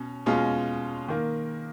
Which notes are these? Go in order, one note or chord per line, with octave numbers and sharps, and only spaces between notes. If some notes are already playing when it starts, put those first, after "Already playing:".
Already playing: B2 C#4
B2 G#3 C#4 F4
D#3 A#3